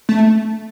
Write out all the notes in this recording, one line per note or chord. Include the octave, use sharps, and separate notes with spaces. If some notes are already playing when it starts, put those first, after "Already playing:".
A3